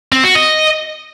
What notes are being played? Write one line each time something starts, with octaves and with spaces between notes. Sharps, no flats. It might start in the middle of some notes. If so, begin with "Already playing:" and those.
C4
F#4
D#5